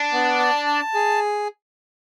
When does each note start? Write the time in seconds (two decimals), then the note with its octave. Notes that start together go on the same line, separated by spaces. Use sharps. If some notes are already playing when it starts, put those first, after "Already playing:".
Already playing: D4
0.12 B3
0.39 A5
0.66 A5
0.94 G#4